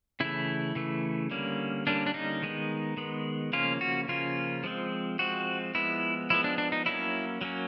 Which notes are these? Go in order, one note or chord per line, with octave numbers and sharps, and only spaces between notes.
C#3 E3 A3 E4
C#3 E3 A3
D3 G3 A#3 C#4
D3 G3 A#3 C#4 D4
D4
D#4
D#3 G#3 B3
D#3 G#3 B3
C#3 F3 A#3 C#4 F4
F#4
C#3 F3 A#3 C#4 F4
F3 G#3 C4
F3 G#3 C4 F#4
F3 G#3 B3 E4
F3 G#3 B3 E4
D4
D4
D#4
F#3 A#3 C#4 E4
F#3 A#3 C#4